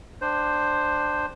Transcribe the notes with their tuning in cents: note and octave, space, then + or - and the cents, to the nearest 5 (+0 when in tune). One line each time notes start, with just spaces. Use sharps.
D4 +15 C5 +0 G5 +10